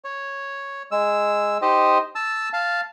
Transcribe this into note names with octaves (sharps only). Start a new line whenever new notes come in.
C#5
G#3 E6
D#4 G4 C5 D#5
A5 E6
F5 A5